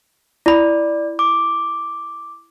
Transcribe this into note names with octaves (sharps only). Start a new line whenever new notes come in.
E4 D5 B5
D6